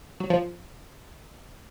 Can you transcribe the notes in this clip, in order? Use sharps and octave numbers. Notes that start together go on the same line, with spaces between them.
F#3
F3